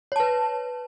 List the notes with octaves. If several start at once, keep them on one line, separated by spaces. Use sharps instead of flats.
B4 C#5 A5